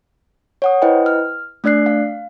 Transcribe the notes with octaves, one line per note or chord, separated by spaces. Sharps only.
C#5 F#5 D#6
E4 B4 C5 D#5 G5
F6
A3 D4 D5 F#6 C7
F5